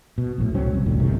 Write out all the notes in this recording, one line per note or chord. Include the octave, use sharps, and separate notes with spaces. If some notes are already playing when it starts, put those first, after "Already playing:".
B2
A#1 A2
C#2 F#3 C4 C#4
D#1 C2
F1 C2 A2 D3
F#1 B1 C3 D#3